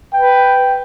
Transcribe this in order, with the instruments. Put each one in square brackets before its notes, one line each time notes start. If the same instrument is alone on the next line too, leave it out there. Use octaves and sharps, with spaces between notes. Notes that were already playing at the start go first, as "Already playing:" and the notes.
[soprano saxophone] B4 [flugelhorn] G5